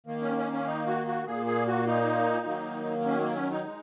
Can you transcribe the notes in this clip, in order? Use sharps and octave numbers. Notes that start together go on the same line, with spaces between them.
D#3 A#3
C#4
C#4
C#4
D#4
F#4
F#4
A#2 A#3 G#4
G#4
F#4
D#4
D#3 F#3 A#3
C#4
A#3
C#4
D#4
G#3